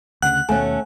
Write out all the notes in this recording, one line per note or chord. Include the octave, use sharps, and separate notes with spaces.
D2 C#3 F#5 F#6
D#2 B2 A3 C#4 F5 G#5